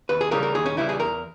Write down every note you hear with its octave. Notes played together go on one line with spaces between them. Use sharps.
D#2 B4
G#4
C#3 E3 G3 A#4
A#4
D#2 G#4
C#4
C#3 E3 G3 E4
G#4
E2 A#4